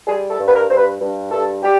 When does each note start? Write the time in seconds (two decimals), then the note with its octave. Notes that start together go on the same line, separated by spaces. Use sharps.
0.07 G3 G#4
0.31 A4
0.39 G2
0.47 B4
0.54 A#4
0.69 G2 C5
0.77 B4
1.00 G2
1.31 G2 A4
1.63 G3 G4